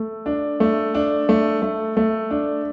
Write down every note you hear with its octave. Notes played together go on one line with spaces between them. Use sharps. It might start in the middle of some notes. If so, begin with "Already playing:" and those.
Already playing: A3
D4
A3
D4
A3
A3
A3
D4